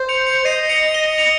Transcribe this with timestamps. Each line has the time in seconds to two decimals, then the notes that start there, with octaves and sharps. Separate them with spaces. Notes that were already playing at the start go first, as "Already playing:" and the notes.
Already playing: C5
0.09 C#7 F7
0.27 C#7 F7
0.45 D#5 C7 D#7
0.69 C#7 F7
0.94 D#7 G7
1.18 C#7 F7